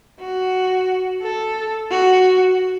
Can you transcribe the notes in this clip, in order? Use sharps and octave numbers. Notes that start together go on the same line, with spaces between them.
F#4
A4
F#4